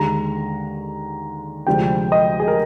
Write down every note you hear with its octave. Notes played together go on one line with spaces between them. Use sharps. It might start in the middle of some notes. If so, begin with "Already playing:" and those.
Already playing: D#2 D3 G#3 A#5
D2 C3 F3 G#3 D4 G5
D#5
G#4
A#4